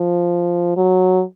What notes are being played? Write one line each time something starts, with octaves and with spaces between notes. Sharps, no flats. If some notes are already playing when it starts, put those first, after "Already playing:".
Already playing: F3
F#3